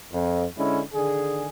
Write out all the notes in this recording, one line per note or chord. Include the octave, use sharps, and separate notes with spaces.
F2
D3 G#3 C#4 E4
D3 D#3 G#4